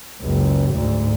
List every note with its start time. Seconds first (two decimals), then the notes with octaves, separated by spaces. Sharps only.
0.21 F#1 C#2
0.72 D2 G#2